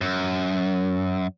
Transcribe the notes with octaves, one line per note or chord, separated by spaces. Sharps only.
F#2